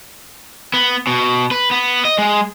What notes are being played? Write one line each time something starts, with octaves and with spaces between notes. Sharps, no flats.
B3
B2
B4
B3
D#5
G#3